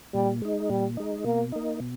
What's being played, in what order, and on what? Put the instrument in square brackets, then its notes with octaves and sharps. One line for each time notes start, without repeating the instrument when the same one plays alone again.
[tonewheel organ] A#2 [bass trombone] G3
[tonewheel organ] G#3 D#4
[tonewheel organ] A#2 [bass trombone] G3
[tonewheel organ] G#3 D#4
[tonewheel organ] B2 [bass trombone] A#3
[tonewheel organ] A#3 D#4
B2